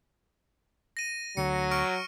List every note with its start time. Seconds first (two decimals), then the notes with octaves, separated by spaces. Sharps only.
0.97 A#6 D#7
1.37 D2 D3 F#3 C#7
1.71 C#6 F6 D7